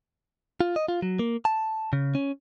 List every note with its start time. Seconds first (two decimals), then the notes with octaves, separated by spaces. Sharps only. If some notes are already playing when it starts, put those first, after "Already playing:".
0.61 F4
0.76 D#5
0.88 F4
1.02 F#3
1.19 A#3
1.45 A5
1.93 C#3
2.15 C#4